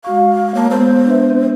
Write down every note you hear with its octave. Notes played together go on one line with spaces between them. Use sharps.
G#3 F#4 F5 C#6
A#3 C#5 A5
G#3 B3 A4 C5
D4 B4 E5
C4